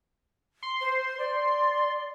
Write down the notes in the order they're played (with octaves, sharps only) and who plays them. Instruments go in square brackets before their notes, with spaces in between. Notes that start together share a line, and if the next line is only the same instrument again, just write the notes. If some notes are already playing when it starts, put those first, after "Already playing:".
[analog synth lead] C6
[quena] C5
D5